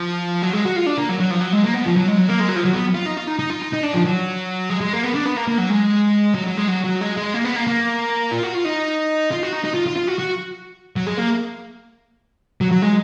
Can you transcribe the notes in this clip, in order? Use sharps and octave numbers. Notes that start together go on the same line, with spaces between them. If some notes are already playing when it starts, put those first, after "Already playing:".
Already playing: F3
F#3
G#3
F#4
F4
D4
A#3
F#3
F#3
F3
F#3
G#3
A#3
B3
F3
F#3
G#3
F#3
A#3
G#3
F#3
F3
F#3
B3
F4
D#4
F4
D#4
D#4
F4
D#4
D#4
D4
F3
F#3
G#3
G#3
A#3
B3
D4
B3
A#3
A#3
F#3
G#3
F#3
F#3
G#3
F#3
F#3
G#3
G#3
A#3
B3
A#3
A#3
F4
F#4
F4
D#4
F4
F#4
D#4
D#4
F4
F4
F4
F#4
F#4
F#3
G#3
A#3
F#3
F#3
G#3